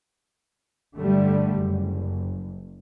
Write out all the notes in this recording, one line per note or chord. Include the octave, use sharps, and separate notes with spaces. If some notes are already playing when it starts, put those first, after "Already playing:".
G2 D3 G3 A3
F#1